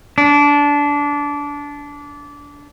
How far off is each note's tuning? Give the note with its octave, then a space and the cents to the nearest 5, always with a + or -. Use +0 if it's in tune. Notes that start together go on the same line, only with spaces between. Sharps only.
D4 -20